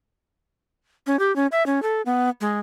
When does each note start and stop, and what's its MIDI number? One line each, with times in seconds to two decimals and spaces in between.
1.07 1.19 61
1.19 1.34 67
1.36 1.47 61
1.52 1.65 76
1.66 1.82 61
1.83 2.02 69
2.06 2.29 59
2.41 2.59 56